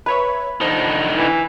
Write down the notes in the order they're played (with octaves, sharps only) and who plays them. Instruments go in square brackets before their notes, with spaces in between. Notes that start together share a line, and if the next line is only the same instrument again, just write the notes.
[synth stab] B4 C#5 E5 [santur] B5
[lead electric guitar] D3 D#4 [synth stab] F3 A5
[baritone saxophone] E3